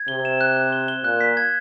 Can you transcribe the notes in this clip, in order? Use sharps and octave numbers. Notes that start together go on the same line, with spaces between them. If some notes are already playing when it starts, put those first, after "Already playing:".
Already playing: G#6
C3 G7
E7
F#6
F#6
G7
G7
A#2 F#6
B6
G#6